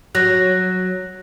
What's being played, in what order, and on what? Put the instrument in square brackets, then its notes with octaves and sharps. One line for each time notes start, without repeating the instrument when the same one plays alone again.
[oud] F#3 [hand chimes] F#6 A#6